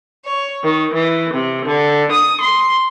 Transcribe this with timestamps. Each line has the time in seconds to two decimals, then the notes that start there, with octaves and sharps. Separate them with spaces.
0.25 C#5
0.64 D#3
0.94 E3
1.33 C3
1.65 D3
2.11 D#6
2.40 C6